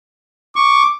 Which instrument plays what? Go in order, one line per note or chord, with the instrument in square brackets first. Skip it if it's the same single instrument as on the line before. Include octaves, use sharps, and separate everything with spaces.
[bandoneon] C#6 [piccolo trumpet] D6